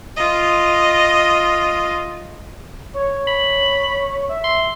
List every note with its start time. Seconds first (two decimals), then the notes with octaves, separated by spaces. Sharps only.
0.17 F4 D#5
2.94 C#5
3.27 B5
4.29 E5
4.44 C6